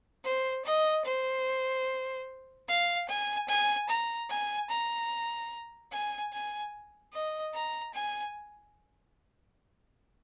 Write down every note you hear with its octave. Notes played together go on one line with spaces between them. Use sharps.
C5
D#5
C5
F5
G#5
G#5
A#5
G#5
A#5
G#5
G#5
D#5
A#5
G#5